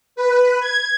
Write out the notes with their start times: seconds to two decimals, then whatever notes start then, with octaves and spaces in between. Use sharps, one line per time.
0.16 B4
0.60 G#6